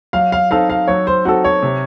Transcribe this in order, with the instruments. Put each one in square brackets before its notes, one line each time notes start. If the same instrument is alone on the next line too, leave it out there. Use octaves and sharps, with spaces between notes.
[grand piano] F#3 [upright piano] F5
[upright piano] F5
[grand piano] C4 D#4 A4 [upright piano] F5
[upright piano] F5
[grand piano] F#3 [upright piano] C#5
[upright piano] C5
[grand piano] C4 D#4 A4 [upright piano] F#4
[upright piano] C#5
[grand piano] C3